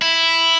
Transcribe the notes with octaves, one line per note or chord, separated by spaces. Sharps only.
E4